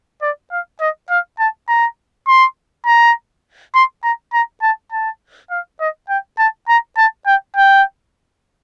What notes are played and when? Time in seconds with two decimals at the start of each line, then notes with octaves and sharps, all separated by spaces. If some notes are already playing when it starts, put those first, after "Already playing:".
0.22 D5
0.51 F5
0.81 D#5
1.10 F5
1.39 A5
1.68 A#5
2.27 C6
2.86 A#5
3.74 C6
4.03 A#5
4.33 A#5
4.62 A5
4.92 A5
5.51 F5
5.80 D#5
6.09 G5
6.39 A5
6.68 A#5
6.97 A5
7.26 G5
7.56 G5